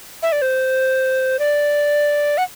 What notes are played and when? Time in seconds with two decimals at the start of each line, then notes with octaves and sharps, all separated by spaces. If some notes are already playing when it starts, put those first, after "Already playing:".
0.22 E5
0.32 D5
0.42 C5
1.39 D5
2.38 F#5